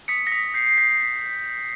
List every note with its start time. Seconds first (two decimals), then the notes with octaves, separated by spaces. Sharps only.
0.08 D#6 B6 C#7
0.27 A#6
0.32 D#6 B6
0.54 G6 C7
0.67 C7
0.78 G6 B6